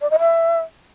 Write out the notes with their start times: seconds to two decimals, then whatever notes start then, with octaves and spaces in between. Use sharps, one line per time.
0.02 D5
0.10 D#5
0.19 E5